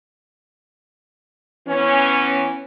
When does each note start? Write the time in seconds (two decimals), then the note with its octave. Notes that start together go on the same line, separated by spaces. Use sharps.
1.68 E3 B3 C#4